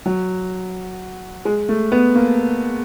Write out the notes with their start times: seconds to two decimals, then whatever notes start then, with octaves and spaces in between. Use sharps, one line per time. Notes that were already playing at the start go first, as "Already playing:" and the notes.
0.06 F#3
1.45 G#3
1.69 A3
1.92 B3
2.16 A#3